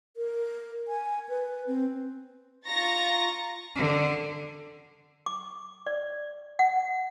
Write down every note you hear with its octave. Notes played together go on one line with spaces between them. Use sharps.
A#4
G#5
B4
C4
F4 A#5 C#6 A6 A#6
D3
D6
D5
F#5